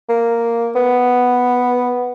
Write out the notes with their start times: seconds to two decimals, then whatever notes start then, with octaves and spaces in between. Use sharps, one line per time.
0.09 A#3
0.75 B3